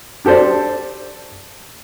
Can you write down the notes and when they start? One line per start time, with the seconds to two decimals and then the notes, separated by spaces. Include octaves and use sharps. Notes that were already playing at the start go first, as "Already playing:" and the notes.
0.25 D4 G4 A4 C5 D5